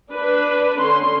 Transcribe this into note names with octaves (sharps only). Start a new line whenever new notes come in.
D4 B4
D3 C#4 C6